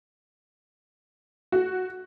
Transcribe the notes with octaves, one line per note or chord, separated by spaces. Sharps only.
F#4